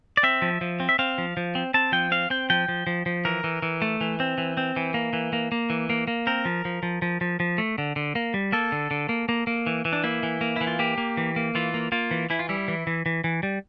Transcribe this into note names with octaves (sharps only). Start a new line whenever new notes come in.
D5
C4 E5
F3
F3
C4
E5
C4 F5
F3
F3
C4
C4 A5
F3 G5
C4 F5
C4 G5
F3 G5
F3
F3
F3
E3 A#4
E3
E3
A3
E3
C4
E3
C4
E3
A#3
E3
A#3
A#3
E3
A#3
A#3
C4 A#4
F3
F3
F3
F3
F3
F3
A3
D3
D3
A#3
G3
A#3 A4
D3
D3
A#3
A#3
A#3
E3
E3
D4
A#3 E4
E3
A#3
E3 E4
F4
A#3 G4
A#3
E3
A#3
E3 F4
A#3
A#3 F4
E3
E3 E4
F4
G3 E4
E3
E3
E3
E3
G3